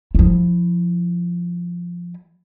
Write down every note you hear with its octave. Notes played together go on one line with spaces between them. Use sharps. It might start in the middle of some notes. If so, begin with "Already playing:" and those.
F3 E4